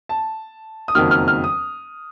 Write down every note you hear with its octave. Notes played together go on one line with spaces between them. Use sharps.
A5
D#6
F#1 F2 D#3 F#3 A#3 F6
F6
F6
D#6